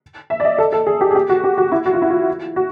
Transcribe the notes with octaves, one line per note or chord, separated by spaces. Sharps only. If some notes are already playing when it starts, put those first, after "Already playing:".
E5
D5
D#5
A4
A4
G#4
G4
G#4
G4
F#4
G4
F#4
E4
F#4
F4
E4
F4
F#4